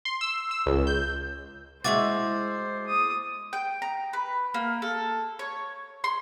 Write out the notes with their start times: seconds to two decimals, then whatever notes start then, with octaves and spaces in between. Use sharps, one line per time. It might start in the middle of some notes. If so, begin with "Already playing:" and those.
0.05 C6
0.21 E6
0.51 E6
0.66 C#2
0.87 G6
1.84 G#3 E4 F#4 C5 D6 A6
2.87 D#6
3.53 G5
3.82 A#5
4.13 B4
4.54 A#3
4.82 A4
5.39 C#5
6.04 C6